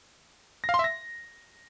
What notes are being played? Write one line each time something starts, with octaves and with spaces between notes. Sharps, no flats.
A#6
F5
C6
E5
A#6